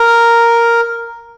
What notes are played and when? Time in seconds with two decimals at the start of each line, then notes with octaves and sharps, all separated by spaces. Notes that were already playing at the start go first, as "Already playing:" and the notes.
Already playing: A#4